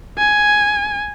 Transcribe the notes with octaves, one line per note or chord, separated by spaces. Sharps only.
G#5